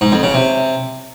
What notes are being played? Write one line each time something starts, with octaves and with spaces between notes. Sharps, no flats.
G#2
F2
C#3
C3